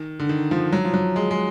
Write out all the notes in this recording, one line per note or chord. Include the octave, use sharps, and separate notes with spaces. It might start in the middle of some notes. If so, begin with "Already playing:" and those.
Already playing: D#3
D3
D#3
F3
F#3
F3
F#3
G#3
G#3